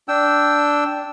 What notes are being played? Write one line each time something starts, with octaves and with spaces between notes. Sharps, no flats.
D4 G5 E6